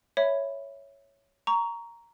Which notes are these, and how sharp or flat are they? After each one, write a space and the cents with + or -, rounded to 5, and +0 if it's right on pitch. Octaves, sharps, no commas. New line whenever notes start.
C#5 +0 E5 +0 B5 +10
A#5 +0 C#6 +20